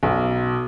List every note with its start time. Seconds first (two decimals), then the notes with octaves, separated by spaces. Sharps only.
0.03 B1